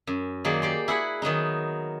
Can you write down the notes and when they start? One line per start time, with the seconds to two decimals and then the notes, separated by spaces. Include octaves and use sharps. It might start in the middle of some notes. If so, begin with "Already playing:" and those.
0.07 F#2
0.45 D#3 F#3 A#3 G#4 D5
0.62 G4 D5 C6
0.88 E4 G#4 F#5 B5
1.22 D#3 F#3 B3 D#4